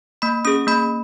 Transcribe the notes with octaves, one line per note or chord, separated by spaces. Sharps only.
A#3 B5
C#4 G#4 D#6
A#3 B5